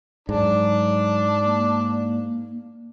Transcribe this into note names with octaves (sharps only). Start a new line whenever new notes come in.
G#2 F#3 D4
A#3